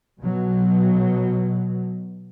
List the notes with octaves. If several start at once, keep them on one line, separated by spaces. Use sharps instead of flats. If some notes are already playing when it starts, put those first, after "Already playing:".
B2 F#3